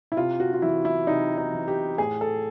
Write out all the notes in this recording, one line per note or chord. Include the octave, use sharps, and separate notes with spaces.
E4
C3 F4
F#4
F4
E3 E4
E4
C3 D#4
D#4
E3
G4
A2 G#4
A4